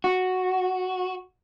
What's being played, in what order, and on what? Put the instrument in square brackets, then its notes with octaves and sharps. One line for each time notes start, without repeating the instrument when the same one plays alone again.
[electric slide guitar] F#4